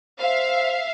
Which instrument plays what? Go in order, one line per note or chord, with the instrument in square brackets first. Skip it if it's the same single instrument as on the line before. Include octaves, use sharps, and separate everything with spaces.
[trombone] C5 [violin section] E5 F5